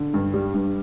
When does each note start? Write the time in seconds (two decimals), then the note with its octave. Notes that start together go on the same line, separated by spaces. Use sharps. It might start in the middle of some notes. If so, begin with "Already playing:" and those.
Already playing: D3
0.14 G2
0.34 G3
0.54 G2